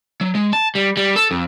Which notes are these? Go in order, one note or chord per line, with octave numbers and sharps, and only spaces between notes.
F#3
G#3
A5
G3
G3
A4
F2